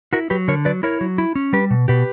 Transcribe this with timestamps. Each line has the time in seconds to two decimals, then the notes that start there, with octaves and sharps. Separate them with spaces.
0.13 E4 F#4 A#4
0.30 F#3 G4 B4
0.48 D3 A#4 C#5
0.65 F#3 B4 D5
0.83 E4 A#4 C#5
1.01 F#3
1.18 E4
1.35 C#4
1.53 G3 G4 B4
1.71 B2
1.88 B2 G4 B4